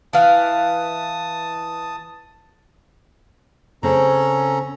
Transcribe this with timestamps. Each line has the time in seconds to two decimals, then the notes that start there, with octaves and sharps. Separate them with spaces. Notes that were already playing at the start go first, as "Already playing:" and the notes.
0.13 E3 F5 A5 D#6
3.83 C#3 C4 C#4 A4 A#5